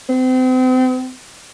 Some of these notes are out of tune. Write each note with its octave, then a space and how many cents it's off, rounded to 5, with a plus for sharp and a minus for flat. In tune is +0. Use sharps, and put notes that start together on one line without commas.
C4 -35